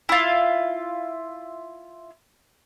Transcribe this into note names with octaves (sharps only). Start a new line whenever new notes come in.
E4 F4